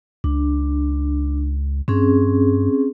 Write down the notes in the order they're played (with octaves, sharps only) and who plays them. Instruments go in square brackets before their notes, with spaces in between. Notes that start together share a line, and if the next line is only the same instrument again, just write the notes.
[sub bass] C#2 [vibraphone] D4
[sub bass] G2 [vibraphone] C4 C#4 G#4